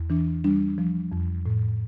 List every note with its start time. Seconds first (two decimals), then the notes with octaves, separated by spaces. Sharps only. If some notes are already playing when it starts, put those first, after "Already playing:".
Already playing: E2
0.10 E3 D4
0.44 G3 D4
0.78 F3
1.12 F2
1.46 A2